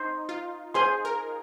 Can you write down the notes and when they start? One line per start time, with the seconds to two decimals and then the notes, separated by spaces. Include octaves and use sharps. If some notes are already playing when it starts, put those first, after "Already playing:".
Already playing: D#4 C5
0.29 F4
0.74 G#4 C5 G#5 C6
1.05 A#4